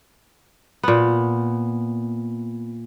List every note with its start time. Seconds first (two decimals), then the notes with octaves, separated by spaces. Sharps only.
0.83 A#2 B3